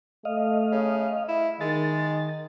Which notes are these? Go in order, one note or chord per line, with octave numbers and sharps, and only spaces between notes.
A3 D#5 F5
C#3
E4
D#3 G#3 A6